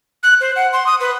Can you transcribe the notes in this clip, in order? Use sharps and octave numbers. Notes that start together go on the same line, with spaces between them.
F#6
C5
F#5
C6
D#6
B4